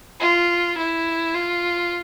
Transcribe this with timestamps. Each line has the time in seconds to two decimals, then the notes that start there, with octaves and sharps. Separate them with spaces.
0.20 F4
0.77 E4
1.34 F4